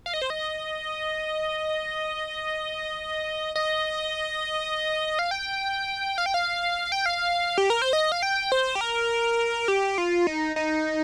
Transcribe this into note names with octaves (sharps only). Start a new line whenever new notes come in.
F5
D#5
C5
D#5
D#5
F5
G5
F5
G5
F5
G5
F5
G4
A#4
C5
D#5
F5
G5
C5
G4
A#4
G4
F4
D#4
D#4